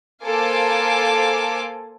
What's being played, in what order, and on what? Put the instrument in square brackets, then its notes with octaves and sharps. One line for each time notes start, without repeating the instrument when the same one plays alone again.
[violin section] A#3 A4 C5 F5 G#5 D6